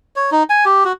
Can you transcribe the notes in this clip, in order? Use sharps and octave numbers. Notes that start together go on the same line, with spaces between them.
C#5
D#4
G#5
G4
F#4